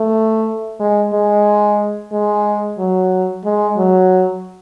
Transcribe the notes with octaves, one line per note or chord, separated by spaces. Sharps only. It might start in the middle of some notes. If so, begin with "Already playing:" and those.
Already playing: A3
G#3
G#3
G#3
F#3
G#3
F#3